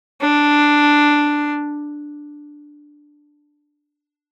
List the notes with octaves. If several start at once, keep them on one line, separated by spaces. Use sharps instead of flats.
D4